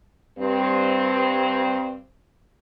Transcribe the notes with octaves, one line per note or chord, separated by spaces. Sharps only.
G2 C4